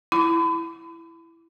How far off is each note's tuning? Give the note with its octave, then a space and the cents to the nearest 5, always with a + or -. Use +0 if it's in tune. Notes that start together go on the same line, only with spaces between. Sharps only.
E4 +10 B5 +40